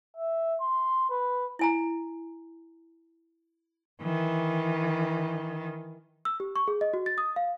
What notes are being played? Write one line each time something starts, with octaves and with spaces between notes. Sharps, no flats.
E5
C6
B4
E4 G#5 A#5
D#3 E3
E6
G4
C#6
G#4
D#5
F#4
A6
D#6
F5